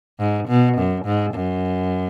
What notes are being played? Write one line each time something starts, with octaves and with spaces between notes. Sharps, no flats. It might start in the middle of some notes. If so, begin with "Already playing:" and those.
G#2
B2
F#2
G#2
F#2